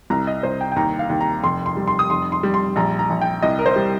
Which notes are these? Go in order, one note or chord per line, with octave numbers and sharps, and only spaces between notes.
C2 A#5
D#5
C2 C5
G5
G5
D#2 A#5
F5
D#2
A#5
F1 C6
C6
G3
C6
D#6
F1 C6
C6
G3
C6
A#1 A#5
A#5
A#1
G5
C2 D#5
A#4
C5
G3